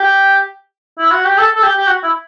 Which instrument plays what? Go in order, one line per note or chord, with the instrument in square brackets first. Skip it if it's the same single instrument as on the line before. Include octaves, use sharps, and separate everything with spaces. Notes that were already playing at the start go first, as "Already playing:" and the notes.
Already playing: [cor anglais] G4
E4
F#4
G4
A4
A4
G4
G4
F#4
E4